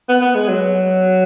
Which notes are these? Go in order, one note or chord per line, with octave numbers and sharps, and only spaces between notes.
B3
B3
G#3
F#3